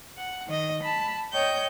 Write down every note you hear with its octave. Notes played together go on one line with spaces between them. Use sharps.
F#5
D#3 D#5
A5 B5
C#5 D#5 G5 G6